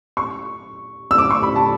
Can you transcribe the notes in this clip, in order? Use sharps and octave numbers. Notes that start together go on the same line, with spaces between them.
C#6
E6
D6
C#6
B5
A5